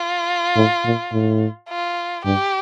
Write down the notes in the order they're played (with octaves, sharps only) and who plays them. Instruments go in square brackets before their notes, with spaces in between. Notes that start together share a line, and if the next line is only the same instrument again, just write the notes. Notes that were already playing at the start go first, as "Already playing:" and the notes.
Already playing: [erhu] F4
[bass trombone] A2
A#2
A2
[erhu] F4
[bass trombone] G2 [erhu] G4